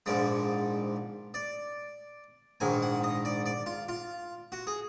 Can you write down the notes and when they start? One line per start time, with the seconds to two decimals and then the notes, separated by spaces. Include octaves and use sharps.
0.06 A#1 G#2 F3 G#3 D5
1.34 D5
2.60 A#1 G#2 D#3 G#5
2.82 F#5
3.04 D#5
3.25 D5
3.46 D5
3.66 F4
3.89 F4
4.52 F#4
4.67 G#4